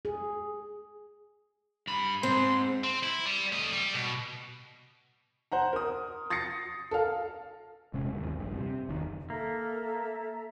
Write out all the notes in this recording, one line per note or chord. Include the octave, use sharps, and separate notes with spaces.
G#4
G2 B5
G#2 C4 C6
C4
E4
G3
A3 D#5
G3
B2
C5 F#5 A#5
A#4 D#6
D#6 A6 A#6 C7 C#7
A4 A#4 F5
E1 C3 G#3 C#4
G1 D#2
A#1 G2
C3
F#1 D#2 D#3
A#3 A4 E5 A#5